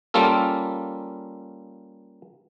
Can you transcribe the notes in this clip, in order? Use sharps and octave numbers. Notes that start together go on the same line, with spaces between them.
G3 A#3 C#4 F4 A4